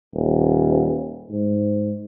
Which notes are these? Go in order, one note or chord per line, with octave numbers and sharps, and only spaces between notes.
D#1
G#2